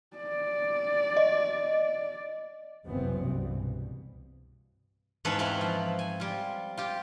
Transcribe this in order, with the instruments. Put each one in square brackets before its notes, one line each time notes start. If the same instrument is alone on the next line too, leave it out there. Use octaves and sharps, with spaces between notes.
[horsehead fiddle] D5
[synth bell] D#5
[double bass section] F#1 C2 F#2 E3 B3 C4
C2 G2 B2 E3
B2
[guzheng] E2 G#2 C#4 A4 B4 F5
C4 C#4 E4 B4 F5
F3
G#5
G3 F4
F4 G4